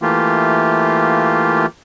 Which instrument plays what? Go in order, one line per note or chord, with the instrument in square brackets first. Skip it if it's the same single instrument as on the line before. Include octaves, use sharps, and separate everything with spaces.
[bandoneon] E3 A3 A#3 F4 G4